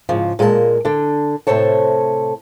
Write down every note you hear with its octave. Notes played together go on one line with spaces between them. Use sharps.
G#2 C#3 F3
A#2 G#3 A#3 A#4 A5
D3 D4
A2 C3 A4 C5 C#5 A5